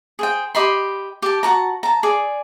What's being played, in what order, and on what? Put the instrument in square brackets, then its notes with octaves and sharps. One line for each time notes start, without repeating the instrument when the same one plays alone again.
[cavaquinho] G#4 C5 G5
G4 D#5 B5 C6
G4 A5
F#4 A5 A#5
A5 A#5
G#4 D5